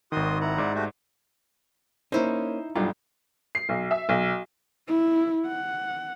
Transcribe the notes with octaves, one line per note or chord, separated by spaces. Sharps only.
G#1 D#3 F#4 C6 D#6
E4 F#5 A#5
G#2 D5
A3 F#4 G4
A#3 C#4 D#4 E4 C5
B1 G2 F4
C7
B1
E5
B1
E4
F#5